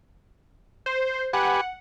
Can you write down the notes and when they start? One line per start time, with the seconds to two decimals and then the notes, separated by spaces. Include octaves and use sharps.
0.86 C5
1.33 G4 B4 F#5 G#5